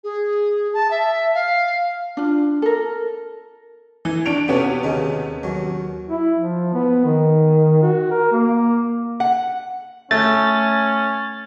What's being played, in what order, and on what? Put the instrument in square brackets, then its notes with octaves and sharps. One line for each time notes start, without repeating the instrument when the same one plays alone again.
[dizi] G#4
A5
E5
F5
[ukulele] D4 F4
A4 A#4
[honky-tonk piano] E3 [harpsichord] G#5
[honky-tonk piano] D4 D7 F7 [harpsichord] C#6
[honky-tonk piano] C3 B3 C#4 [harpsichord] F#4 G4
[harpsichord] D#2 C#3 D#4
D#2 F#3
[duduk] E4
F3
B3
D#3
F#4
A#4
A#3
[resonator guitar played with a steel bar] F#5
[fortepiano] A3 [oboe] C#4 [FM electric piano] A6